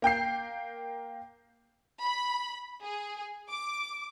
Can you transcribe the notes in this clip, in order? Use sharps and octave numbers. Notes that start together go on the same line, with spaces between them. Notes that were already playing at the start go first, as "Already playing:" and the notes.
A#3 G5 G6 C7
B5
G#4
D6